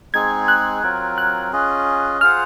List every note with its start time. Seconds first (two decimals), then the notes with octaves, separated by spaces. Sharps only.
0.13 G#3 C4 D#4 G#4 G#6
0.48 F#6
0.83 F#3 C4 F4 A#4
1.18 F#6
1.53 C#4 F4 G#4 D#5
2.21 F4 G#4 C5 F#5 F6